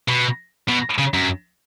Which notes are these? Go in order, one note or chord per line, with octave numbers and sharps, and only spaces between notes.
B2
B2
C#3
F#2